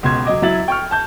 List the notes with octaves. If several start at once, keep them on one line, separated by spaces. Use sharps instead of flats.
C#2 B2 C6 G#6
F#3 D#5 D6
F#3 E4 E5 A6 F#7
G5 C#6 F6
A5 G6